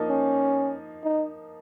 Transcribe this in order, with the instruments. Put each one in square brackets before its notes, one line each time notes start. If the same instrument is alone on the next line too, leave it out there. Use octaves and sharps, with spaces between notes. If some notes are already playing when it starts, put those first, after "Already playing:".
Already playing: [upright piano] F3 A#3 D#4
[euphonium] C#4
D#4